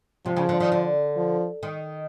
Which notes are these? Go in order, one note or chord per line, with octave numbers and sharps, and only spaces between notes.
C3 F3
C#3
D3
D#3
D3
F3
D#3